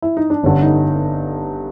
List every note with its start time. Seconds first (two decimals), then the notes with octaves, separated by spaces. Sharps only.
0.02 E4
0.17 D#4
0.30 D4
0.43 G1 G2 D3 C#4
0.62 D#4